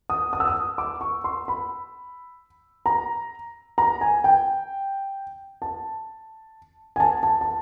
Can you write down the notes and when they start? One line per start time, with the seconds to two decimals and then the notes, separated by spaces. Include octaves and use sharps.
0.10 D#6
0.33 D#6
0.40 E6
0.48 D#6
0.78 D6
1.01 C#6
1.24 C6
1.48 B5
2.86 A#5
3.78 A#5
4.01 G#5
4.24 G5
5.62 A5
6.96 G#5
7.00 A5
7.23 A5
7.41 A5